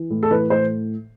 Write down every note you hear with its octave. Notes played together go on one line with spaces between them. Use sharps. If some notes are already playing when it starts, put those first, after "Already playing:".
Already playing: E3
A2
A4
E3 B4
A2 C5